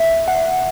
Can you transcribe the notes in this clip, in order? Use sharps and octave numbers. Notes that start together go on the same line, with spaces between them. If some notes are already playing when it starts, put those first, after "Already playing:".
Already playing: E5
F#5